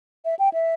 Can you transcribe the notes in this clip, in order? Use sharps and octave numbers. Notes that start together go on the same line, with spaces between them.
E5
G5
E5